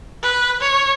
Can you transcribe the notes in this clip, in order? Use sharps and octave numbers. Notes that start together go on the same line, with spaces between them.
B4
C#5